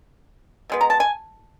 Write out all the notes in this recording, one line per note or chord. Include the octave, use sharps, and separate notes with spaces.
B2 G#3 B3
A#5
A5
G#5